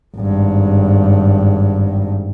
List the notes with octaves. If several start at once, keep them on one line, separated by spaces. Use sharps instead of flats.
G#1 G2